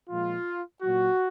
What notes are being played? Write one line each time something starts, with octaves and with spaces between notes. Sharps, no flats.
A#2 F3 G#3 F4
A#2 F#3 F#4